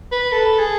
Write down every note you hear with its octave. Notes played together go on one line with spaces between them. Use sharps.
B4
A4
G#4